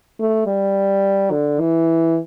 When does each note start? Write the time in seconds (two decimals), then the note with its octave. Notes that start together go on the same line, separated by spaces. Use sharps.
0.20 A3
0.47 G3
1.31 D3
1.60 E3